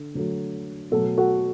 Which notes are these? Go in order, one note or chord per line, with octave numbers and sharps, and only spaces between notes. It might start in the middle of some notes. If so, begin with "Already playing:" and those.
Already playing: D3
D3 F#3 A3
B2 F#3 A3 F#4 A4
F#4 A4